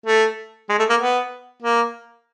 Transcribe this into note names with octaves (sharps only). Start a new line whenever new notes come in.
A3
G#3
A3
A#3
B3
A#3